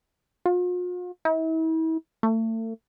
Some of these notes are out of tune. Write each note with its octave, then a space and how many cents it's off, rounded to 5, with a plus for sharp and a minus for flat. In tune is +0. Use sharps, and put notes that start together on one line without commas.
F4 +45
E4 -40
A3 +35